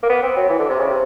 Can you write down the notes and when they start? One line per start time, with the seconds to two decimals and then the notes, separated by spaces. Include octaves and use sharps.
0.03 A#3
0.09 B3
0.23 C4
0.36 F#3
0.49 E3
0.59 D3
0.69 C3
0.80 C#3
0.89 C3